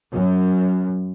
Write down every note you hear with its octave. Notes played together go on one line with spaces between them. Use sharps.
F#2